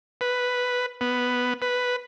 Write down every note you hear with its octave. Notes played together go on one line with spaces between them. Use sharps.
B4
B3
B4